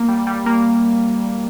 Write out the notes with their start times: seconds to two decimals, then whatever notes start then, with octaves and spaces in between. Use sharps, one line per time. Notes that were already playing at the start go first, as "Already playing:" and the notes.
Already playing: A#3
0.09 G3
0.27 G3
0.46 A#3